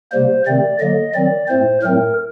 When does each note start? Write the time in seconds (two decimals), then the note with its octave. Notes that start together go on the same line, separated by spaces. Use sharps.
0.12 C3 G3 A#3 C5
0.46 C3 D#3 A3 C4 D5
0.80 D3 F#3 A#3 D#5
1.14 D#3 F#3 C4 D5
1.48 A2 A3 C4 C5
1.83 A2 F#3 A3 C4 A#4